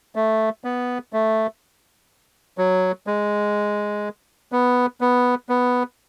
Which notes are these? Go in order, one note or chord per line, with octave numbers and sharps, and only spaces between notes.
A3
B3
A3
F#3
G#3
B3
B3
B3